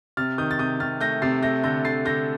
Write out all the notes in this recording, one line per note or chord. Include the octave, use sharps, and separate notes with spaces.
C3 F6 A6
D#3 D#6 G6
A6
C3 D#6 G6
C3 F6 A6
A3 G6 A#6
C3 A6 C7
A3 G6 A#6
D3 G6 A#6
D3 A6 C7
D3 G6 A#6